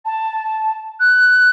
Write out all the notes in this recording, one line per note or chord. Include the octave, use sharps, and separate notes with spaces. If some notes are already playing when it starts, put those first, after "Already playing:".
A5
F#6